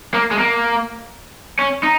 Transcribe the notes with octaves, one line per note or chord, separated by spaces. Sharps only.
A#3
G#3
A#3
C#4
D#4